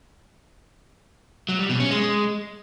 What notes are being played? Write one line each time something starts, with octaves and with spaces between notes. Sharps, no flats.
F#3
G3
B2
C#4
G#3